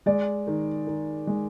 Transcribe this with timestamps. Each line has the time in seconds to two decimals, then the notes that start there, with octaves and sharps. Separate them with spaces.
0.06 G#3 D5
0.47 D#3
0.87 D#3
1.27 G#3